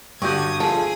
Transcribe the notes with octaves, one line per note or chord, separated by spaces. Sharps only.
G2 D3 F#4 C#6 D#6 G6 G#6
F3 A3 G#4 A5